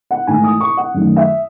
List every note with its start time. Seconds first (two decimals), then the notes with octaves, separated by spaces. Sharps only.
0.11 F#5
0.27 G#2 E3 A3 G#5
0.44 D#6
0.60 C#6
0.77 F#5
0.94 F#2 D#3 A3
1.16 E5